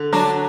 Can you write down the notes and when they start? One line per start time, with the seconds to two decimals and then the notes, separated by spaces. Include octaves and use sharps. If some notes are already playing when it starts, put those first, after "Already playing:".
Already playing: D3
0.13 F#3 D4 F#4